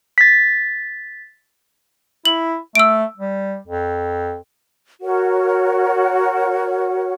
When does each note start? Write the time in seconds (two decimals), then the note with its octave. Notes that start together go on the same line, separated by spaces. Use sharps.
0.18 A6 B6
2.25 E4 F#7
2.75 A3 E6 D7
3.17 G3
3.67 F2
5.02 F#4 A#4 C#5 F#5